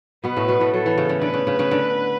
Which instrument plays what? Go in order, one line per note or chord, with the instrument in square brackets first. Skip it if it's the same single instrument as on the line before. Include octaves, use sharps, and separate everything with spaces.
[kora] B2 B3 [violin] B4
[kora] A2 A3
B2 B3
A2 A3
[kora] F#3 [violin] A4
[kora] E3
C#3
C#3
[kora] D3 [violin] B4
[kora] C#3
C#3
C#3
D3